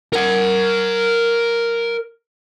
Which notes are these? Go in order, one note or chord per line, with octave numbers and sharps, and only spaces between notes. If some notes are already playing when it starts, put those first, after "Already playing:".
A#4 F#5